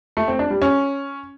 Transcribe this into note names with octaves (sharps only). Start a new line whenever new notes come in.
A3
C4
D4
G3
C#4